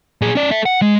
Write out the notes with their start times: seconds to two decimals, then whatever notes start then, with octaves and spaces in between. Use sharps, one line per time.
0.22 A#2 G#4
0.35 C#4 D5
0.51 A4 E5
0.66 F#5
0.82 G#3